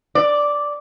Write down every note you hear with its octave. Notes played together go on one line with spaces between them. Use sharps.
D5